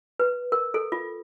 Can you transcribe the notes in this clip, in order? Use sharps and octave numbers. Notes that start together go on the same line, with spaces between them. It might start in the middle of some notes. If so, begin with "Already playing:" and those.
B4
A#4
A4
F4